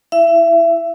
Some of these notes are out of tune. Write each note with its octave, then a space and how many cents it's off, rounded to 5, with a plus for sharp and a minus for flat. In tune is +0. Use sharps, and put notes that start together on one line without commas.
E4 +0 E5 +30